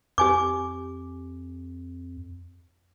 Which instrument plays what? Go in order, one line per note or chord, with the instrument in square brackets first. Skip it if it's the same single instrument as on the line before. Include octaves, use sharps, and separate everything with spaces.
[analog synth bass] F2 [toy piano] G4 G#5 D6